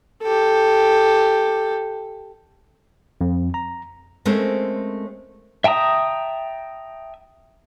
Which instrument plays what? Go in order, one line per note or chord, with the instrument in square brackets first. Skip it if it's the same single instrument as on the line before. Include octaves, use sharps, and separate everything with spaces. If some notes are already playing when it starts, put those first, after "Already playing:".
[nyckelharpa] G4 A4
[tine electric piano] F2
A#5
[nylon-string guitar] G#3 A3 C4 C#4 A#4 C5
[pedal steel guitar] E5 G5 A5 A#5 D#6